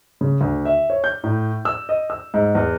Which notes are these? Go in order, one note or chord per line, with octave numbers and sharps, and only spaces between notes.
C#3
D2
E5
C#5
G6
A2
E6
D#5
E6
G#2
E2